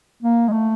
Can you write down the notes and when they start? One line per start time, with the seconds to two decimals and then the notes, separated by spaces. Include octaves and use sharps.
0.23 A#3
0.48 G#3
0.52 A3